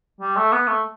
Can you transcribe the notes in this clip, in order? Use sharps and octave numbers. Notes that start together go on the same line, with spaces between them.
G3
A3
B3
A3